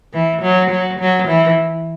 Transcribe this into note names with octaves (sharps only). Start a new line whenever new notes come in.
E3
F#3
F#3
F#3
E3